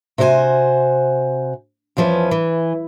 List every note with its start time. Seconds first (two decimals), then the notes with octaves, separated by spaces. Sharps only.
0.18 C3 F#4 C5 D5 G#5
1.97 F2 E3 F3 C#4 B4
2.31 E3